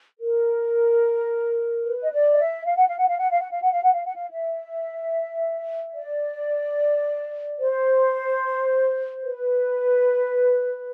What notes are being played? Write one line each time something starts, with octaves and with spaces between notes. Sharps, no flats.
A#4
B4
D#5
D5
D#5
E5
F5
F#5
F5
F#5
F5
F#5
F5
F#5
F5
F#5
F5
F#5
F5
F#5
F5
E5
D5
C5
B4